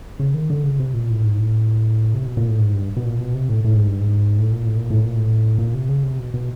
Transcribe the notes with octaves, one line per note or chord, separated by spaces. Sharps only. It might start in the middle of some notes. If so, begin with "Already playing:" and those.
C#3
D#3
D3
C#3
C3
A#2
A2
G#2
A2
C3
B2
A#2
A2
G#2
G2
B2
A#2
B2
C3
A2
A2
G#2
G2
G#2
A2
A#2
A2
A#2
A2
A#2
A2
A#2
C3
C#3
C3
B2
B2